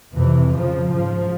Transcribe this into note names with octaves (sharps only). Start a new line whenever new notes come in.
F2 C3 E3
F2 C#3 F3
G#2 F3